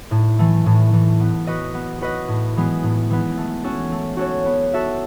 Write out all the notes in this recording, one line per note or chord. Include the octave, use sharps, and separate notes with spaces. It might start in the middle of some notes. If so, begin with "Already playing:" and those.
A2
E3 A3
A2
E3 A3
B3
F#4 B4 D#5
B3
F#4 B4 D#5
A2
E3 G#3 B3
A2
E3 G#3 B3
A3
C#4 F#4 A4 C#5
A3
C#4 F#4 A4 C#5
B3
F#4 A4 E5